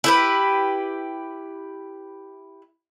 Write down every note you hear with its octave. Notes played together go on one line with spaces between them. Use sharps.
E4 G4 B4